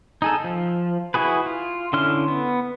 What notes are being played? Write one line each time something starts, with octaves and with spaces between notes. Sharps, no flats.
D#4 G#4 A4
F3
E4 F#4 G#4 B4
F4
D3 C#4 E4 C6 F6
B3